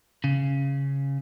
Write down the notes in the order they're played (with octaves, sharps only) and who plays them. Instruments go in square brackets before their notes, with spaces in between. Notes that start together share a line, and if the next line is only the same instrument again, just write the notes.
[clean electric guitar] C#3